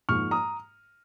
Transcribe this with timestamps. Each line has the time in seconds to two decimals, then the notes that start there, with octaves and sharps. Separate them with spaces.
0.09 G#2 F3 A#3 C#6 F6
0.31 A#5 D#6